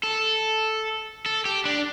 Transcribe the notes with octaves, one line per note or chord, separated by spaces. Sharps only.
A4
A4
G4
D4